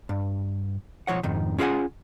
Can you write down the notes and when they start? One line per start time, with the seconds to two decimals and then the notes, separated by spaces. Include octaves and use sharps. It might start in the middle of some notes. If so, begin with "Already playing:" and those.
0.09 G2
1.07 B1 F3 C#5 F#5
1.23 F2 G#2 D#3
1.58 C#4 F4 G#4 C#5 F#5 G#5